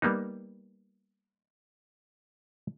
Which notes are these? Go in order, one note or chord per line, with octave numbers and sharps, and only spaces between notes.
G3 A#3 B3 D#4